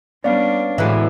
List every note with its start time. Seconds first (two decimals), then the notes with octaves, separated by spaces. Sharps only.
0.24 G3 B3 C#4 D4 D5 F5
0.78 D2 A2 E3 G#3 E5 A#5